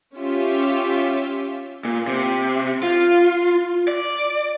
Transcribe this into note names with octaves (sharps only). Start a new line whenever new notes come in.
C#4 F4 G4 E5
A#2
C3
F4
D5